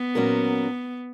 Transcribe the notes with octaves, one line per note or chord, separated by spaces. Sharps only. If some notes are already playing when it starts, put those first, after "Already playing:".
Already playing: B3
A#2 F#3 C#4 F#4 A#4